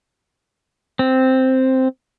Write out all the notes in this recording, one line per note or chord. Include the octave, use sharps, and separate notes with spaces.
C4